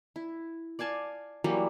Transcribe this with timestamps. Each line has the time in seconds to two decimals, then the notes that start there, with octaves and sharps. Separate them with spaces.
0.16 E4
0.79 D5 F5 G#5 A5
1.44 E3 F#3 G3 A#3